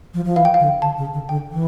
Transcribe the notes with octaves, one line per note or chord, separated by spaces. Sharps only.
F3
F3
E3 F5
G5
F5
D3
D3 A5
C#3
D3
D3 G5
E3